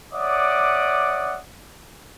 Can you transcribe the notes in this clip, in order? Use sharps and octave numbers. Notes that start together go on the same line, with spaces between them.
C#5 D5 E5 F#5 D6 D#6